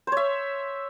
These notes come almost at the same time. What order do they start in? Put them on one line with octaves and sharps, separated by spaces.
C5 C#5 E5